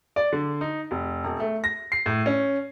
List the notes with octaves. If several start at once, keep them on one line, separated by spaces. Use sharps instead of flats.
D5
D3
D#4
F1
E1
A3
A#6
C7
A2
C#4